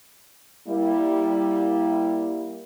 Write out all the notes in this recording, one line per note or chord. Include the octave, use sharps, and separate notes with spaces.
G3 A#3 E4